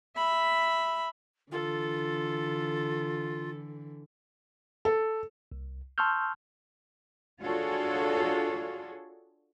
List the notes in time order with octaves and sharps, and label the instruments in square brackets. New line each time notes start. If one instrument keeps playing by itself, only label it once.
[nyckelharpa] E5 B5
[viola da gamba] D3 E3 [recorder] F4 [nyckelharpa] A4
[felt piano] A4
[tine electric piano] C2
A5 C6 C#6 E6 F6 G6
[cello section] D4 F4 F#4 G#4 A4 C#5